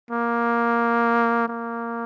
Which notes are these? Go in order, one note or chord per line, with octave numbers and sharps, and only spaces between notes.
A#3
A#3